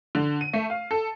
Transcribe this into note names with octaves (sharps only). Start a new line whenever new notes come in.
D3
D#7
A3
F5
A4